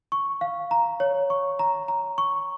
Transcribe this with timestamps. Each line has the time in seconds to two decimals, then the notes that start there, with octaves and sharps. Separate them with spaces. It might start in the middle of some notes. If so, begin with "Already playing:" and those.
0.12 C#6
0.41 F5
0.71 A#5
1.00 C#5
1.30 C#6
1.59 A#5
1.88 A#5
2.18 C#6